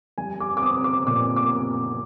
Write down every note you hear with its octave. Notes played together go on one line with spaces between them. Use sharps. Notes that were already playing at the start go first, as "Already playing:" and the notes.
G3 G#5
D6
D6
C4 D#6
D6
A#2 D6
D6